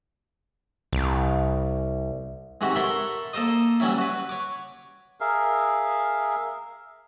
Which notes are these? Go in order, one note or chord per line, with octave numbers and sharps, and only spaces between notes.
C2
G#2 C3 E3 F#4 G4
A4 A#4 C#5 E5 B5 C6
A#3 A4 A#4 C5 D#5
E3 F#3 G3 C#4 E4
F#4 B4
C#5 D6
G#4 A#4 E5 F5